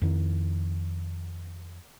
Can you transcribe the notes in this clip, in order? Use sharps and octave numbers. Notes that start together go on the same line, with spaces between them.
F2 D#3